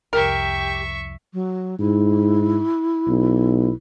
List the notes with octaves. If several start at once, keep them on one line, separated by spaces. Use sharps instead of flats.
C2 F2 G4 A#4 E5 C#6
F#3
G#2 E4
B1